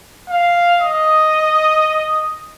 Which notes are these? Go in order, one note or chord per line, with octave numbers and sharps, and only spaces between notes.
F5
D#5